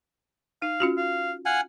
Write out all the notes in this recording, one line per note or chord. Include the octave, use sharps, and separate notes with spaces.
D#4 F5
C#4 F4 F#4
F5
F5 F#5 G#5